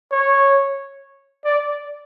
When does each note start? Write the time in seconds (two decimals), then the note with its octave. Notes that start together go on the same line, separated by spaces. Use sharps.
0.11 C#5
1.45 D5